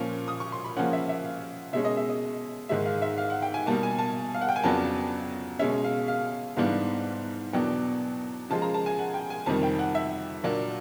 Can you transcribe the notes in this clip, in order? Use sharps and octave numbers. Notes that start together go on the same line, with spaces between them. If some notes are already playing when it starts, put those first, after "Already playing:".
Already playing: A#2 F3 A#3 C#4 C#6
D#6
C#6
C6
B5
C#3 F3 A#3 C#4 F#5
E5
E5
F5
B2 G#3 C#4 E5
D#5
E5
D#5
G#2 D#3 G#3 E5
F5
E5
F5
F#5
G5
G#5
B2 G3 A#3 A5
G#5
A5
F5
F#5
G5
G#5
F2 C#3 F#3 B3 D4 A5
B2 G#3 C#4 E5
F5
F5
G#2 E3 G3 B3 D4 F5
E2 B2 F#3 B3 D4 G5
C#3 F3 G#3 A5
A#5
A5
G#5
F#5
G5
G#5
F2 C3 D#3 G3 A5
G5
F#5
E5
A#2 F#3 A#3 D4